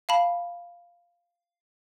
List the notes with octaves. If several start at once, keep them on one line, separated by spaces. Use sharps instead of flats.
F5 A5 B5